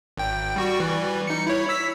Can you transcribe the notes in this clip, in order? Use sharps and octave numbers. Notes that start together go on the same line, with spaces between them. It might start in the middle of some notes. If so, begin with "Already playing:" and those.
G#1 G5
G3 F#4 C#6
E3 G3
D#4 C#7
E4 C#5
E6 B6